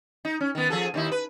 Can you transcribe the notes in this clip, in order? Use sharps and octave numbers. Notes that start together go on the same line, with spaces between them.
D#4
C#4
D#3 B3
F3 G#4 A4
D#2 D#4 E4
B4